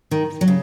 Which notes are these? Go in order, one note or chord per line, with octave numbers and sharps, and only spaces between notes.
D#3
F#3
C#3